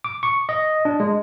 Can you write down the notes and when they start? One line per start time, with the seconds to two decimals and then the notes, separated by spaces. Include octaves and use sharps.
0.04 D6
0.23 C#6
0.49 D#5
0.85 D4
1.00 G#3